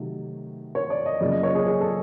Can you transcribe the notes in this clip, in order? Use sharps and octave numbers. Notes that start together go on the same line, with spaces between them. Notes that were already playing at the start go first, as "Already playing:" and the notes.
Already playing: C3 D#3 F#3 A3
C#5
D5
D#5
F#2 C#3 F3 A#3 D5
D#5
C#5
G#4
G#4
A4